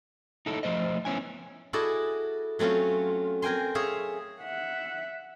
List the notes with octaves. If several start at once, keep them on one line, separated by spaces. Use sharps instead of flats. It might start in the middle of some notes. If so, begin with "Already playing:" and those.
D#4 E4 A4
F3 A3 C5 D#5
B3 C#4 E4 G#5
E4 F#4 G#4 A4 D5 D#5
F#3 A3 C4 C#4 F4
C4 A#4 G5 G#5 C6
G#4 C#5 E5 F5
E5 F#5